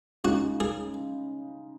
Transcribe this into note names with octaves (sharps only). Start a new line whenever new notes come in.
C#3 G#3 D#4 F#4
G#4